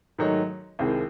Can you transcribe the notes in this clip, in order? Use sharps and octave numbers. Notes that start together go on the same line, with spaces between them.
G#2 D#3 F#3 A3 D#4
C2 C3 D#3 G#3 C4